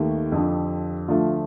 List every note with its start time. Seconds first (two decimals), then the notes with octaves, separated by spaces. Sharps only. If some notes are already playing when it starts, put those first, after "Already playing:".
Already playing: D#2 D#3 A3 G4
0.32 F2 D3 F3
1.08 D2 D3 F3 A3 F4